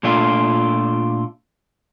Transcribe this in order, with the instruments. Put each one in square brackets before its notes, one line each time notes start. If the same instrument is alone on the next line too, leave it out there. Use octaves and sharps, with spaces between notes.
[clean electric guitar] A#2 A3 D4 F4